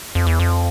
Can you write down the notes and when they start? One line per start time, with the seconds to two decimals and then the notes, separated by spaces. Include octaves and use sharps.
0.15 F2
0.27 E2
0.40 F2